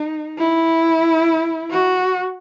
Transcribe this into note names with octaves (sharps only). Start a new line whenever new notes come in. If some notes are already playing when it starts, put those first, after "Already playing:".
Already playing: D#4
E4
F#4